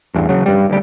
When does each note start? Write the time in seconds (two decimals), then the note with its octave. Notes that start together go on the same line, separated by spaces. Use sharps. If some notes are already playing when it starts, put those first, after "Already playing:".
0.14 A1 E2 G2
0.29 C#3 F#3
0.46 G2 G3
0.70 D2 G3